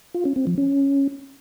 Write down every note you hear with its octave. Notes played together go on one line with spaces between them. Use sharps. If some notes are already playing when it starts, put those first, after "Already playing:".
F4
C#4
C4
F3
C#4